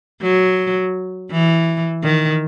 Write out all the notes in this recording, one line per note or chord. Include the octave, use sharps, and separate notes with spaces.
F#3
E3
D#3